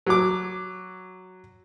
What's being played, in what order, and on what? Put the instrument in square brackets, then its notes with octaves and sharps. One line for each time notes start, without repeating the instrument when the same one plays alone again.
[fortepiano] F#3 D6